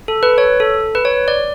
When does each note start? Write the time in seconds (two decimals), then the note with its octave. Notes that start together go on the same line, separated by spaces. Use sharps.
0.08 A4
0.23 B4
0.38 C#5
0.60 A4
0.95 B4
1.05 C#5
1.28 D5